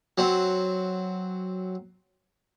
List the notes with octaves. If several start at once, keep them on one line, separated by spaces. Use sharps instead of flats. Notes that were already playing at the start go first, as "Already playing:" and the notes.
F#3 C4